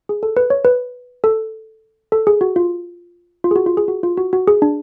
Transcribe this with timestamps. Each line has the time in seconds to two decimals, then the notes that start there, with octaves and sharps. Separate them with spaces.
0.09 G#4
0.23 A4
0.37 B4
0.50 C#5
0.65 B4
1.24 A4
2.12 A4
2.27 G#4
2.41 F#4
2.56 F4
3.44 F4
3.51 G#4
3.56 F#4
3.66 F4
3.77 G#4
3.88 F#4
4.03 F4
4.17 F#4
4.33 F#4
4.48 G#4
4.62 D4